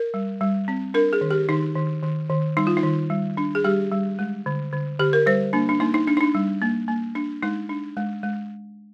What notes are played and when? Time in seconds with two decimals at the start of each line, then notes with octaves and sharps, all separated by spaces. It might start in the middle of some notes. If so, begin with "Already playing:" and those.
Already playing: A#4
0.14 G3
0.41 G3
0.68 C4
0.94 D4 A#4
1.13 G#4
1.21 D#3
1.31 G4
1.49 D#3 D#4
1.76 D#3
2.03 D#3
2.30 D#3
2.57 G3 D#4
2.67 F4
2.77 D#4
2.83 D#3
3.10 G3
3.37 D4
3.55 G#4
3.64 G3 G4
3.92 G3
4.19 G#3
4.46 D3
4.72 D3
5.00 D3 G4
5.13 A#4
5.26 G3 C5
5.53 A#3 D4
5.69 D4
5.80 A#3 D#4
5.94 D#4
6.07 D4
6.17 D#4
6.21 D4
6.35 G3
6.62 A#3
6.88 A#3
7.15 D4
7.43 G#3 D#4
7.69 D4
7.97 G#3
8.23 G#3